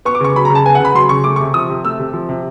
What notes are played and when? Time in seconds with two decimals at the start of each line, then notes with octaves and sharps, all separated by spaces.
0.05 B3 C#6
0.15 D6
0.20 C#3 C#6
0.36 F#3 B5
0.45 A#5
0.50 C#3
0.55 A5
0.65 B3 G#5
0.75 F#5
0.80 C#3 B5
0.95 F#3 C6
1.09 C#3 C#6
1.24 A3 D6
1.36 C#6
1.40 C3
1.54 F3 D#6
1.69 C3
1.85 A3 E6
1.99 C3
2.13 F3
2.29 C3